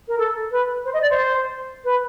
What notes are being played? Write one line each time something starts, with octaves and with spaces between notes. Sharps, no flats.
A#4
A4
B4
C5
D#5
D5
C5
B4